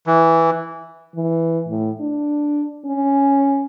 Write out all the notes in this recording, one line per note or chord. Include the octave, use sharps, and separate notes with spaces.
E3
E3
A2
D4
C#4